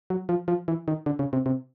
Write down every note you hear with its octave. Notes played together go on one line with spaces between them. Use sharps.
F#3
F3
F3
E3
D#3
D3
C#3
C3
C3